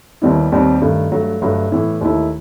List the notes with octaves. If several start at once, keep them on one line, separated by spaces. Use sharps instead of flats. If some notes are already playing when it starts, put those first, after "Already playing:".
D#2 D#3 G3 B3 E4
D#2 D#3 G3 C4
G2 D#3 A3
G2 F#3 A3
G1 G2 F#3 A3
A2 E3 B3 E4
D#2 D#3 A3 E4